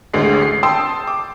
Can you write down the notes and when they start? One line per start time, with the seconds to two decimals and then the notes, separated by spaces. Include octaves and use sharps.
0.14 A1 D2 G#3 C7
0.42 C7
0.63 G5 A5 C6 D#6 E6
1.08 D6